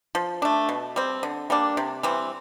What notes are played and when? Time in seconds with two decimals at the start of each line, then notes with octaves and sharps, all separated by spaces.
0.15 F3
0.42 A3 D4
0.69 B2
0.96 G3 C4
1.23 D3
1.50 G3 A#3 D4
1.77 C3
2.03 E3 G3 C4